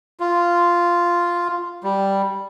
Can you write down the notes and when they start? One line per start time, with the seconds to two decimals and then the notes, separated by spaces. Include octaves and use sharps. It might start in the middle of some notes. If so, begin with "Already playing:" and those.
0.20 F4
1.83 G3